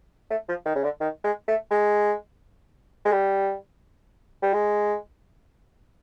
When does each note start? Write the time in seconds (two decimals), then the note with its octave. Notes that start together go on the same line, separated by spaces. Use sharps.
0.30 A3
0.49 F3
0.66 D#3
0.75 C#3
0.84 D3
1.01 D#3
1.24 G#3
1.48 A3
1.71 G#3
3.05 G#3
3.12 G3
4.42 G3
4.53 G#3